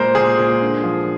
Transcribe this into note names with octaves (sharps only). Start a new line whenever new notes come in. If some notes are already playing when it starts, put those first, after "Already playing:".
Already playing: A#2 G#3 A#4 C5
A#2 G#4
A#2
D3
F3